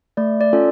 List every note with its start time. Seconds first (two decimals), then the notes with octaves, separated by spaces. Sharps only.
0.17 A3 D5
0.41 D5
0.53 C#4 F4 A4